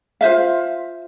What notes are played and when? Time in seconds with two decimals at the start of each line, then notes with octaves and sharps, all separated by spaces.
0.21 F4 C5 E5 F5